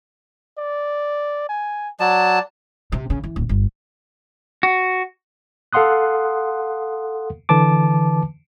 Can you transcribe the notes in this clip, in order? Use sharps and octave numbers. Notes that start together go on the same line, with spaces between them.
D5
G#5
F#3 D5 A5
C3
C#3
E3
D1
G1
F#4
A4 F5 F#5 C6 D#6 F#6
D3 E3 B4 A5 D6